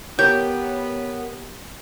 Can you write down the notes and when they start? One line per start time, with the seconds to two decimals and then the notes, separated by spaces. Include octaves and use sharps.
0.19 B3 G4 A#4 C#5 G6